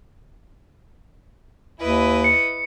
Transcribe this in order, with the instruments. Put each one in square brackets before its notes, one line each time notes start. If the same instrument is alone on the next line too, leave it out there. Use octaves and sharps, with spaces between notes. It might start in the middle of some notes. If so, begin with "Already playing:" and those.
[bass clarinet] D#2 [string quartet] E4 B4 D#5
[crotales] C#7